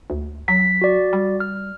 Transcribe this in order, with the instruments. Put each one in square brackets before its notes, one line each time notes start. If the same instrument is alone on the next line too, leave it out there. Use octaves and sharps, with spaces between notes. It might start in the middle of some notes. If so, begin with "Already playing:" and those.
[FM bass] D2
[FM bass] F#3 [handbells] B6
[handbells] F#4 D5
[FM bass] G3
[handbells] F6